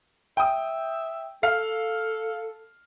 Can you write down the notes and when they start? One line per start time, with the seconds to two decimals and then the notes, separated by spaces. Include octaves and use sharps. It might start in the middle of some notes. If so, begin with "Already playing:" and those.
0.37 E5 G5 D#6
1.43 A4 F5